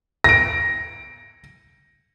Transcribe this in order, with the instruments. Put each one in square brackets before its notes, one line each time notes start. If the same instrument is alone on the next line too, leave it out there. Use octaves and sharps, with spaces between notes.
[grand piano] A#6 D7